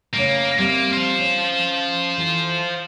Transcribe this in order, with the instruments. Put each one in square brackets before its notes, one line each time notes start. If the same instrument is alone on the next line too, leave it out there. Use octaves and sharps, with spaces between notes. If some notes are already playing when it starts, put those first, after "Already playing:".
[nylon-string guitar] C#3 A3 F5 [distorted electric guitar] A#3
[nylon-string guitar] G3 C4 E5 [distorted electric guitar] A#3
[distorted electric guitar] C5 F5
[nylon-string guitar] C#4
E3 F4 A4